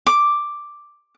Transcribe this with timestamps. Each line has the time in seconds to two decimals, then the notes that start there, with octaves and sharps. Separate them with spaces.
0.07 D6